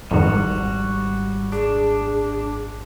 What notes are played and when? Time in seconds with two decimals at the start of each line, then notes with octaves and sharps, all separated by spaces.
0.11 G#1 F2 G#2 D#3 G3 F#4
1.52 D4 G#4